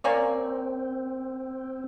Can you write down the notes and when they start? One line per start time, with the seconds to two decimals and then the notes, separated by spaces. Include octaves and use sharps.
0.04 A#3 C4 C#4 D5